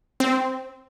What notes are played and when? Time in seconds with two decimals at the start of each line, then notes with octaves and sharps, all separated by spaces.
0.20 C4